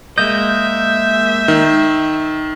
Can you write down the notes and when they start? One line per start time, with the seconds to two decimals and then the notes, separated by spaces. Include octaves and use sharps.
0.18 G#3 A#3 D#5 E5 G6
1.48 D#3